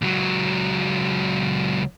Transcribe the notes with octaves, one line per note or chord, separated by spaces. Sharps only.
C#2 F#3